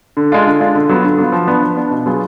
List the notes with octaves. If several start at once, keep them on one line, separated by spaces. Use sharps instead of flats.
D3
G#3 D4 F4
D3
G#3 D4 F4
D3
F#3 B3 F4
D3
F#3 B3 F4
F3
B3 D4
F3
B3 D4
B2
F#3 B3 F4 G#4